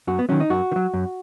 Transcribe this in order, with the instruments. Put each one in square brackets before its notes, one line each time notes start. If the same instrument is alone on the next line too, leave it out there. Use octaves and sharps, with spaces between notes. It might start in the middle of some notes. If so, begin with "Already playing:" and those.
[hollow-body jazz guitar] F#2 F#4
B3
D#3 F#3 C#4
D#4
F#2 F#4
D#3
F#3
F#2